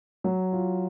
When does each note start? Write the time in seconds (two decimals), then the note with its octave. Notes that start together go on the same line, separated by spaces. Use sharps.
0.24 F#3
0.52 F4